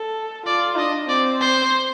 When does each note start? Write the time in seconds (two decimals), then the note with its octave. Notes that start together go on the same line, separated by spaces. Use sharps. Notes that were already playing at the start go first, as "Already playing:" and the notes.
Already playing: A4
0.47 F4 D5
0.78 D4 D#5
1.09 C4 D5
1.41 C5